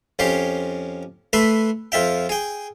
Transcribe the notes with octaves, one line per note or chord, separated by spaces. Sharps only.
F2 C#4 G4 C6
A3 B4 E5 C6
F2 F4 E5 G5
G#4 G5